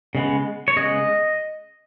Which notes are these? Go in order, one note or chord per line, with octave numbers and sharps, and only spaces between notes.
C#3 G#3 B3
C#5
C#3 G#3 B3 D#5